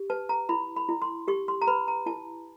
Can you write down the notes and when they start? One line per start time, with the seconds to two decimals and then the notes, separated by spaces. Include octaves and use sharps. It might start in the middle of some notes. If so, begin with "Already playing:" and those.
Already playing: G4
0.10 B4 A5
0.29 A#5
0.49 E4 B5
0.76 B5
0.89 E4
1.02 C6
1.28 G4 C#6
1.48 C6
1.62 A#5
1.67 B4 B5
1.88 A#5
2.06 E4 A5